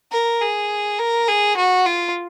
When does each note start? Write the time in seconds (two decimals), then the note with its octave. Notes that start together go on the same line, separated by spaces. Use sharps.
0.12 A#4
0.41 G#4
0.99 A#4
1.28 G#4
1.57 F#4
1.86 F4